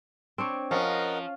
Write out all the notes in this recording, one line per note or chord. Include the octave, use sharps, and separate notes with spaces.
C4 D4 C#5
F3 C#4 A#4 D#5 F#5